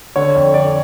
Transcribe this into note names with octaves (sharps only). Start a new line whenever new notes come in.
D3 C#5
F2
D3 D5